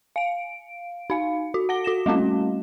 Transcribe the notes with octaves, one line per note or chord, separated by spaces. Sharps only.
F5 D7
D#4 F5
F#4
F#5 A#6 G7
F#4 A#6 E7
G3 A3 C#4 F#4